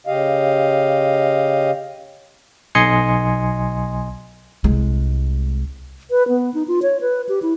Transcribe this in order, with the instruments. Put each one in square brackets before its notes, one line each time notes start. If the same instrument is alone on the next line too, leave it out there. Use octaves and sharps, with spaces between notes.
[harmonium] C#3 G4 D#5 F5
[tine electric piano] B1 D#5 G#5 C6 C#7
[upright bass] C2 G#3
[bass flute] B4
B3
D#4
F4
C#5
B4
G4
E4